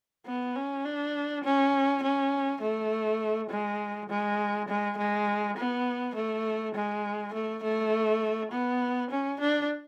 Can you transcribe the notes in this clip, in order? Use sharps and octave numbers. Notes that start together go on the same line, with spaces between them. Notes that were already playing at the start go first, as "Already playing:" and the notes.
B3
C#4
D4
C#4
C#4
A3
G#3
G#3
G#3
G#3
B3
A3
G#3
A3
A3
B3
C#4
D4